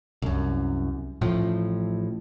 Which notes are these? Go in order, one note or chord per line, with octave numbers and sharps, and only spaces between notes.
C2 F#2
A1 A2 F3